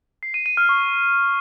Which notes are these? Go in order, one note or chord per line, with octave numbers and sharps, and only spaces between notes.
C7
D#7
D#7
F6
C#6